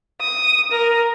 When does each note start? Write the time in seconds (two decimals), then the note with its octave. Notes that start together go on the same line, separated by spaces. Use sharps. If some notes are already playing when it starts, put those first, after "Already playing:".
0.21 D#6
0.71 A#4